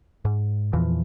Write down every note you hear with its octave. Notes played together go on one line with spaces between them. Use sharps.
G#2
E2 A#2 E3 F3